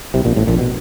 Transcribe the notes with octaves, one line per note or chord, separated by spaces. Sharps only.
C2 C3
A#1 A#2
A1 A2
A#1 A#2
B2